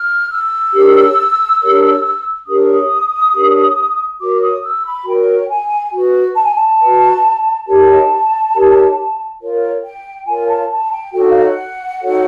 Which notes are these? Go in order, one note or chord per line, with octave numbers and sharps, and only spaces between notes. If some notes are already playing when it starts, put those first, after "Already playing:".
Already playing: F6
E6
D4 G4 A#4 C#5
D4 G4 A#4 C#5
D4 G4 A#4 C#5 D#6
D4 G4 A#4 C#5
F#4 A#4 C#5 D6
D#6
E6
B5
F#4 A#4 C#5 G5
G#5
F#4 B4
A5
G#5
A5
F#4 B4
D#4 G4 A#4 C#5 A5
D#4 G4 A#4 C#5
F4 A#4 C#5
G5
F4 A#4 C#5 G#5
A5
A5
G5
D#4 F#4 A4 C#5 G5
F#5
F5
F#5
D#4 F#4 A4 C#5